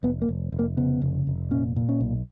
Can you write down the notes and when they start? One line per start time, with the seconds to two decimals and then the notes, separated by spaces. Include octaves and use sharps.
0.03 F1 B3
0.22 A#3
0.29 F1
0.52 F1
0.59 A#3
0.77 C#3 B3
1.02 F1
1.27 F1
1.51 A#2 C#4
1.76 A#2
1.89 C#4
2.00 B1